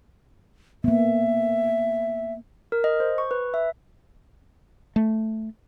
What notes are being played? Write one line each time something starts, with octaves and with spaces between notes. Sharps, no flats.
A#3 B3 E5
A#4
D#5
C5
C#6
B4
E5
A3